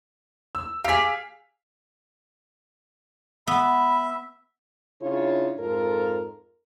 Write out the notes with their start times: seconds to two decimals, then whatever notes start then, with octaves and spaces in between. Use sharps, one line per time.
0.55 E6
0.84 G4 G#4 F5 B6
3.47 B3 E5 B5
5.01 C#3 D4 E4 F4 C#5
5.58 F2 G#2 F4 A4 A#4